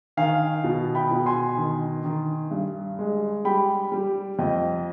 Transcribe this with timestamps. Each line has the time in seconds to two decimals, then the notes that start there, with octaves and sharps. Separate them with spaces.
0.17 D#3 F5 G#5
0.64 B2
0.95 G5 B5
1.11 B2
1.26 G#5 C6
1.57 D#3
2.05 D#3
2.51 G2
2.99 G#3
3.45 G3 G5 B5
3.92 G3
4.39 F2 D#5 G5